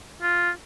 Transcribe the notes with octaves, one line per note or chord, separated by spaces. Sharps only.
F4